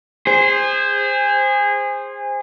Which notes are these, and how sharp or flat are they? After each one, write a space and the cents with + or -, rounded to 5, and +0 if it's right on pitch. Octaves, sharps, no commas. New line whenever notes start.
G#4 -25 C5 +0